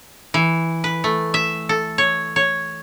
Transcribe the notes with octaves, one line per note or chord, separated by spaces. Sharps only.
E3
B4
A3
E5
A4
C#5
C#5